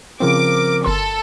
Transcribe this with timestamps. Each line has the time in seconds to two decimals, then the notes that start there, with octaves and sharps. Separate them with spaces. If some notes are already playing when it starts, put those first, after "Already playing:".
0.20 C#3 F3 C4 A#4 D6
0.84 G1 A4 A#4 C6